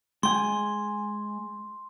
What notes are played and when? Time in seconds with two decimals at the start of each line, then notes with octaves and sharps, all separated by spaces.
0.23 G#3 G5 G#5 C6